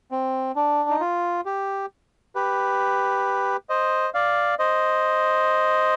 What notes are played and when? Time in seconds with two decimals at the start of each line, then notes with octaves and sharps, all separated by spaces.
0.11 C4
0.56 D4
0.90 D#4
1.01 F4
1.46 G4
2.35 G4 B4
3.69 C5 D#5
4.14 D5 F5
4.59 C5 D#5